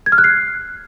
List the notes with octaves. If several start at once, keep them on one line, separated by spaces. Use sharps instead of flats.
G#6
F6
F#6
C7